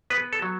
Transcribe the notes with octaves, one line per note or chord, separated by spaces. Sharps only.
B3 B4
A4
F#3